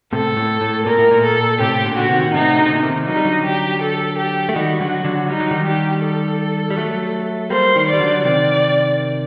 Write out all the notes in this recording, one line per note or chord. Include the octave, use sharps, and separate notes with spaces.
A2 C3 A4
A2
A2
A#2 A#4
A2
A#2
A4
A2 C3 G4
A#2 D3
D3 F#4
C3 D#3
A#2
A2 C3 D#4
D3
C3
A#2 D3
C3 D#3
F#3 D#4
G3
D3 F#3
G4
A4
G4
A3
D#3 G3 F#4
D3 F#3
D3 F#3
G3 D#4
F#3
D#3 G3
G4
A4
G3
F#3 A3
G3 A#3 C5
D#3 G3
G3 D5
D3 F#3
C3 D#3 D5